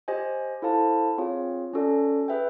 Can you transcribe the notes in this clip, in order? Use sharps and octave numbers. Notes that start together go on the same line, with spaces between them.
G4 C5 D#5 G#5
E4 A4 C5 F5 A5
C4 F4 G#4 C#5 F5
C#4 F#4 A4 D5
G#4 B4 E5 G5